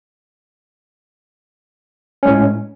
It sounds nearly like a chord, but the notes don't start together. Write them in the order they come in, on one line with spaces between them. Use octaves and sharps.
C#4 G#3 A2